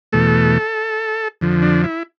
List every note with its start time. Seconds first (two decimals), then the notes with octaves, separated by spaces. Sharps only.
0.13 E2 B2 A3 A4
1.41 F2 D3 F3
1.62 D4
1.84 E4